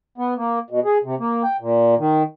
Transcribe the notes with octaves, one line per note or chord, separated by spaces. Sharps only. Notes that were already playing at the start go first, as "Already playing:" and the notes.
B3
A#3
B2
G#4
C3
A#3
G5
A#2
D#3